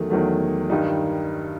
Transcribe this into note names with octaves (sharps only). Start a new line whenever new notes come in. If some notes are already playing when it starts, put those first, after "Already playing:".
Already playing: E2 D#3 F#3 A3
E2 D#3 F#3 A3
G2 D#3 G3 D#4